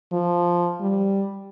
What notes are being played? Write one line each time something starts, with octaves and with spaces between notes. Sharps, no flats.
F3
G3